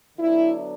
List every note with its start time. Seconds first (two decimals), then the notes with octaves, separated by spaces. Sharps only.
0.18 D3 F#3 B3 D4 E4